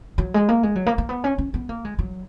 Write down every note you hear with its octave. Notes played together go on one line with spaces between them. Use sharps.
F#3
G#3
A#3
G#3
F#3
A#3
A#3
B3
C#4
C#4
B3
A#3
G#3
F#3